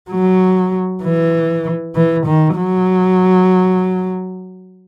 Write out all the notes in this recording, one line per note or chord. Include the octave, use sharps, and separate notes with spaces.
F#3
E3
E3
D#3
F#3